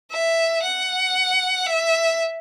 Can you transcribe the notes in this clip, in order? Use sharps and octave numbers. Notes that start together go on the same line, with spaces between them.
E5
F#5
E5